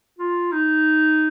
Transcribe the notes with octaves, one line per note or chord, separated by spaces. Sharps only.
F4
D#4